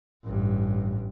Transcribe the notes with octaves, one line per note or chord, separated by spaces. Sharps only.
A1 G2